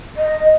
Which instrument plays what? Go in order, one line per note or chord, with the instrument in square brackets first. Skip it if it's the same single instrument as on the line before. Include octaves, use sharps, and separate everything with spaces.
[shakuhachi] D#5